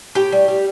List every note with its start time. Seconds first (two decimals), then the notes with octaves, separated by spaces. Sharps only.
0.15 A2 G4 G5
0.32 G3
0.48 G3